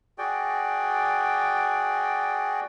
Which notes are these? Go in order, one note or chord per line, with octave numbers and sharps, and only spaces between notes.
F#4 G#4 D5 G5